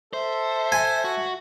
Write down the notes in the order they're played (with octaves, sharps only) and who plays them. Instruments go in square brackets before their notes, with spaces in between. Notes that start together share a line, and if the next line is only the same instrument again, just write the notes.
[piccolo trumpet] A4 [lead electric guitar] C5 [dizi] E5
[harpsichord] G#5
[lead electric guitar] F#4